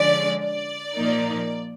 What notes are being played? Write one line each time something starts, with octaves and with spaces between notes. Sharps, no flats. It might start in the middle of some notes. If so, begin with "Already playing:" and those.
Already playing: D3 F3 G#3 C#4 D5
D5
A#2 F3 A#3 D#4